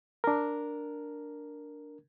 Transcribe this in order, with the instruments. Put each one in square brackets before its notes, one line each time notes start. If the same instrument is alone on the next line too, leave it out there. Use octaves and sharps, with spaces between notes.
[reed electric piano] D4 A#4